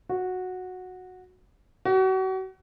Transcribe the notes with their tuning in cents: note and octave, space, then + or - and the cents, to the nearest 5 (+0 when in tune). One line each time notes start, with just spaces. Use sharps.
F#4 -10
F#4 +35